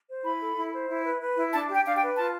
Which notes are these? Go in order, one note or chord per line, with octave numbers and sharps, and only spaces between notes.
C5
E4 B5
A4
E4
C5
E4
B4
B4
E4
D4 A5
G4
G5
D4 F5
G5
B4
F4 A5